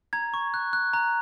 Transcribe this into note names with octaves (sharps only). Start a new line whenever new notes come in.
A#5 G#6
C#6
F#6
F#6
A#5